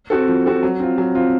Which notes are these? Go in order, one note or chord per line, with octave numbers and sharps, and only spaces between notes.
C4 F#4 A4
F3
C4 F#4 A4
F#3
C4 F4
F#3
C4 F4